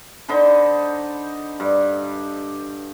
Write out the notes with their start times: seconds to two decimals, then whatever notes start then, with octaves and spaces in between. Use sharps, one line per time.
0.29 D3 D#4 C5 B5
1.60 G2